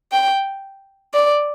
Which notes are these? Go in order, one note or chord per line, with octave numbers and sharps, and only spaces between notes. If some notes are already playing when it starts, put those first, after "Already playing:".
G5
D5